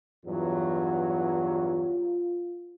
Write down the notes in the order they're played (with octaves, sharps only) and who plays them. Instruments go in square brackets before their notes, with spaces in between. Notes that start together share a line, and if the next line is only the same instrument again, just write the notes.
[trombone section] E2 G2 F#3 [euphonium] F4